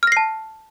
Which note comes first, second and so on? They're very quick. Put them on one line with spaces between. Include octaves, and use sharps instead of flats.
F6 A#6 C7 A5